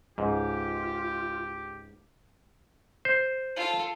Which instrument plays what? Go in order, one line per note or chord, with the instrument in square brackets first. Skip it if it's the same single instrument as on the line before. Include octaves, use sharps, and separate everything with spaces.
[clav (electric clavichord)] C#2 G#2 [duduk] F4 [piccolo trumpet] G4
[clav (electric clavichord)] C5
[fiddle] F4 A4